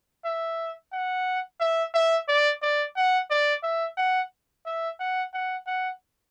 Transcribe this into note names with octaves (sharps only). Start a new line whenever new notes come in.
E5
F#5
E5
E5
D5
D5
F#5
D5
E5
F#5
E5
F#5
F#5
F#5